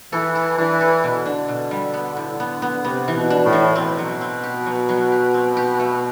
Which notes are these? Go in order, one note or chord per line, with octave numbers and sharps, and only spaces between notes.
E3 A4
A4
E3 D4
A4
B2 D3
D4
B2
G3
B3
A2
B3
B3
C3 B3
E3
B2
D4
A2
E3
B2 C4
F#3
C4
G4
F#3
F#3
G4
C4
G4
A3